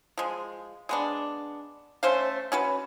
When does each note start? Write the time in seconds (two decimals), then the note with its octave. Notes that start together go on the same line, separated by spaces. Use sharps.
0.18 F3 G#3
0.89 G#3 B3 D4
2.03 A3 C#4 C5 F5
2.52 C#4 F#4 B4